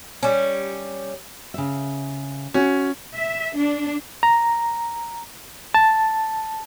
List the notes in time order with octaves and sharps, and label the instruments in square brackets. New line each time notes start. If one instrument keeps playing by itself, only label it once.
[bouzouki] G3 C#4
[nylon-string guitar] C#3 E5
[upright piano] C#4 [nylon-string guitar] F#4
[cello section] E5
D4
[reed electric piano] A#5
A5